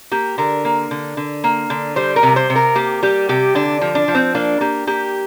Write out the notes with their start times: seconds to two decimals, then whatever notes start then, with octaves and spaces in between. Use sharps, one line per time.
0.11 A#3 G4
0.38 D3 A#4
0.65 A#3
0.91 D3
1.17 D3
1.44 A#3
1.70 D3
1.96 G3 C5
2.16 A#4
2.23 C3
2.36 C5
2.50 C3
2.56 A#4
2.75 A#3 G4
3.03 G3 G4
3.29 C3 G4
3.55 D3 D4
3.81 F3
3.95 D4
4.08 F3
4.15 C4
4.35 A#3 D4
4.61 A#3 G4
4.87 A#3 G4